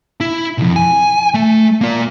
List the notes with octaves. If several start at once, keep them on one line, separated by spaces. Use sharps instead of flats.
E4
B1 F2
G#5
A3
A#3 F4